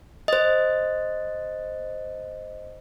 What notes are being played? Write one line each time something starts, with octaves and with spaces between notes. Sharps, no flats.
C5 D#5